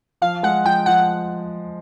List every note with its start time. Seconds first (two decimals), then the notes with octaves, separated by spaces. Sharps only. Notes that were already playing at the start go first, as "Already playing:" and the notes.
0.22 F3 F5
0.43 G#3 F#5
0.65 F3 G5
0.86 F3 F#5